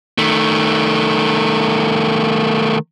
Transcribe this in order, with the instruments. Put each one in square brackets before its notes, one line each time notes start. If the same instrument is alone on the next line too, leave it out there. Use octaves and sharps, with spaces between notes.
[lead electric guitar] D#3 A3